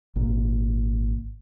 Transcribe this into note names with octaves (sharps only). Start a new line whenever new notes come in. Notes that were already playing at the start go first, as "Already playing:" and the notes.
G#1 A#2